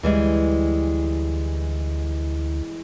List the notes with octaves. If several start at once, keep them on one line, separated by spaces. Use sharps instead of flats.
D2 E3 G3 G#3